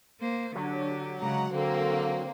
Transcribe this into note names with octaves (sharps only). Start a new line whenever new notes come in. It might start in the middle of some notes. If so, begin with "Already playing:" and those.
A#3 C5
D3 F#3 D4 G4
C#3 G#3 F#5 A#5
D3 A#3 C4 A4 A#4